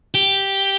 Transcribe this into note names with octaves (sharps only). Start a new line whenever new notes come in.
G4